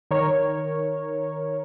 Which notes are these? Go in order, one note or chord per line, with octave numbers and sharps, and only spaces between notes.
D#3 A#4 C#5